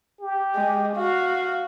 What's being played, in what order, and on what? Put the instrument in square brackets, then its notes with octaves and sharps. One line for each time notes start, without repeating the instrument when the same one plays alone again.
[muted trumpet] G4
[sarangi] G#3
[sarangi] F#4 [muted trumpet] F5